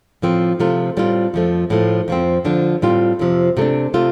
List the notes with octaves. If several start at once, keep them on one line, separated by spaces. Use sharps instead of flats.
A2 F3 C4
C3 F3 A3 F4
A2 G3 C4 F4
F2 F3 A3
A2 F3 A3
F2 F3 C4
D3 F3 D4
A2 G3 C4 F4
F2 C3 F3
C3 A3 D4
C3 A3 F4